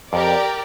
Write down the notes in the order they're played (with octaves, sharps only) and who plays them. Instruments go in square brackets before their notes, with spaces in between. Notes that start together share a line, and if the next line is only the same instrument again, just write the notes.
[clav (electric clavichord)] F2 [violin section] G4 A#4 D5